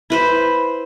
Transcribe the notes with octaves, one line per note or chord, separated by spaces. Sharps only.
E4 B4 C5